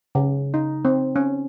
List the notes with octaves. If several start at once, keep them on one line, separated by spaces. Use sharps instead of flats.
C#3
D#4
C4
C#4